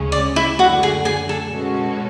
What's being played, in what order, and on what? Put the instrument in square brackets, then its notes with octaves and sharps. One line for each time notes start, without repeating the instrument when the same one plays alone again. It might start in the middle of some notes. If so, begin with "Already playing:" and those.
Already playing: [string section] D2 C#3 G#3 C#4
[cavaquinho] D5
E4 E5
[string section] F#2 D3 F#3 A3 [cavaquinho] F#4 F#5
[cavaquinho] G#4 G#5
G#4 G#5
A4
[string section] B2 G#3 C#4 F#4 A4